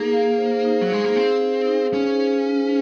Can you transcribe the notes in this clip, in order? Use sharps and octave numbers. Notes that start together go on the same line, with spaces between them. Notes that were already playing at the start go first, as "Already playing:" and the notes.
Already playing: A#3 D#4 G#4
F5
C5
D#4
F#3
G#3 G#4
A#3
C4 F5
C5
D#4
C#4 G#4